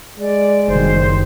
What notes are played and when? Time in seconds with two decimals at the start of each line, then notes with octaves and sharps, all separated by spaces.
0.20 G#3 D5
0.68 F#1 B2 D#3 G3 C5